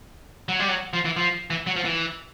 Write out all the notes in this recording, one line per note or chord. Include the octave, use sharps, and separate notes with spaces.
F#3
G3
F#3
F3
E3
F3
E3
F#3
F3
E3